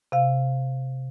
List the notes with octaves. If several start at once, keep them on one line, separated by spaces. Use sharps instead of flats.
C3 F5